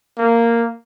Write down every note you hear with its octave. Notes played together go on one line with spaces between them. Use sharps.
A#3